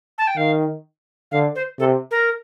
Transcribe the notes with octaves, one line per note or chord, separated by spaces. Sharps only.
A5
G5
D#3 F5
D3 F5
C5
C3 A4
A#4